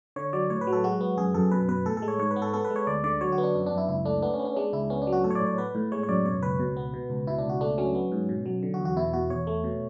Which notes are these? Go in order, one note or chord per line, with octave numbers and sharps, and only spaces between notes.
D3 C#5
F#3 D5
A2 C#5
B4
F#3
A4
G#3 F#4
B3
F#2 G#4
F#2 A4
B2 B4
B2 B4
A2 A4
A4
G#3
C#5
G#2 C#5
B4
B3
A4
B3 A4
B4
G#3
C#5
D2 D5
D3 D5
F#3 C#5
F#4
B3
D4
F#2 D4
D4
F#2
E4
C#2 E4
A3 D4
B3 D4
C#4
B3
C#4
G#3 D4
C#2 E4
B3 C#4
D4
F#3
F#4
A2 A4
C#5
D5
A2
C#5
B3 B4
A2
G#3 C#5
C#5
F#2 D5
B2 C#5
C#2 B4
B2
B3
B2
C#2
B2 E4
D4
C#2
F#4
A3 D4
F#3 C#4
B3
G#2
B2
F#3
D3
F#4
E2
F#4
B2 E4
B2 F#4
E2 C#5
A3
B2